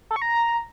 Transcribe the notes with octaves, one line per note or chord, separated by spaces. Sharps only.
A4
C#6
A#5